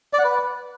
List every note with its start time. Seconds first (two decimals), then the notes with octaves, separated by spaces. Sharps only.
0.13 D5
0.19 F#5
0.24 B4